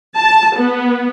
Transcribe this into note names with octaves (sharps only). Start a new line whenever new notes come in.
A5
B3